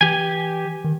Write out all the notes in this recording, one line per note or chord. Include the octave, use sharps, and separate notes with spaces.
E3 G4 G#5
D#3